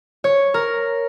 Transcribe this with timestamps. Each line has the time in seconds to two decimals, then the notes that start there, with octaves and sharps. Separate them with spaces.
0.24 C#5
0.54 A#4